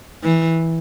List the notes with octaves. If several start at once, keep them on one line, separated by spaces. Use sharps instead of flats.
E3